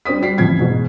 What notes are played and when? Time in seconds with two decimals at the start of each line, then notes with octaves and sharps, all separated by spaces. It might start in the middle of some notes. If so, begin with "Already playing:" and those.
0.05 G2 G3 C5 D#6 B6
0.21 G3 F#4 B6 C7
0.38 A1 F2 E3 G#6 B6
0.59 E2 G#2 B2